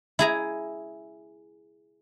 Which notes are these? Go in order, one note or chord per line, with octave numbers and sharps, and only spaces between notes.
E4 G#4 A#5